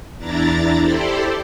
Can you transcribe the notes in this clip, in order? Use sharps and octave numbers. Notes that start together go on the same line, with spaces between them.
E2 D4 E4 A#5 A6
E4 G4 A4 C5 D5